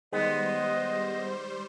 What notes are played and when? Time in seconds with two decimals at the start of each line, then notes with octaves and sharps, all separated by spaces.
0.13 D#3 G3 G#3 B3 C5 D#5